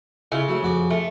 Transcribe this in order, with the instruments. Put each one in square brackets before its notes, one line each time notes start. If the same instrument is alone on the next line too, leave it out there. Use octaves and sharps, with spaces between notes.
[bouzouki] C#3 [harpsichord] E4 F4
[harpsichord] F#3 A3
F2 F#4 D6
[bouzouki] A3 [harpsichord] F4